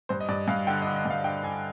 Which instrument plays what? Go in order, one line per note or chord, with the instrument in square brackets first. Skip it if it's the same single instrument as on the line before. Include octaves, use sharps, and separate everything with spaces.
[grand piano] G2 C5
D#5
G2 D5
G2 F5
D3 G5
D#5
D3
D#5
G2 F5
D3 G5
D3 G#5